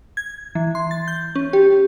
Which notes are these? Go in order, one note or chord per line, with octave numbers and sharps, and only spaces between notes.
G#6
E3
C6
A6
G6
C#4
G4